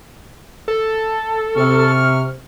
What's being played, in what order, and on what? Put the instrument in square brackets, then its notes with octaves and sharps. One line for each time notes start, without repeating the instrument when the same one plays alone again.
[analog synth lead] A4
[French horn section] C3 [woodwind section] C#6 F6